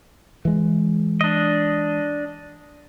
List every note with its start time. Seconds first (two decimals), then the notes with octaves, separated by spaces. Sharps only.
0.45 E3 G#3
1.21 D4 D#5